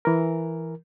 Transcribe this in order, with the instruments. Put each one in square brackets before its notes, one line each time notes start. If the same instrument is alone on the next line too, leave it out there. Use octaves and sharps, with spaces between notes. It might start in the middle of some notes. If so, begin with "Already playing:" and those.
[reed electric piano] E3 A#4